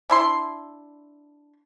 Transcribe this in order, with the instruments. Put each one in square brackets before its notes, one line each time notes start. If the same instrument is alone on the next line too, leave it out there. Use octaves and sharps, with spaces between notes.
[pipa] D4 E4 C6